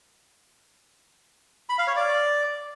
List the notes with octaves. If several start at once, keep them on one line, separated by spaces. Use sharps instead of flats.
B5
F5
C#5
D5